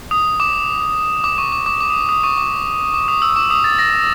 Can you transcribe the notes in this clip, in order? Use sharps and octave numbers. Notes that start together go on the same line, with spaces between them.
D#6
D6
D6
D6
C#6
D6
D6
D6
D#6
D#6
C#6
D6
D6
D#6
E6
D6
D#6
A6
A#6